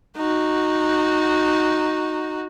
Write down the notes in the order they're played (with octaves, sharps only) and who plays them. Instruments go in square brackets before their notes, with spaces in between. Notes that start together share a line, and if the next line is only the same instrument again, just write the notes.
[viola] D#4 F#4